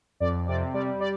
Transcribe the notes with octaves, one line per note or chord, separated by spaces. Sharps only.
F2 D5
C3 D5
G3 D5
D5